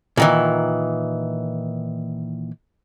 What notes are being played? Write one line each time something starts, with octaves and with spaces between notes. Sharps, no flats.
A#2 D#3 E3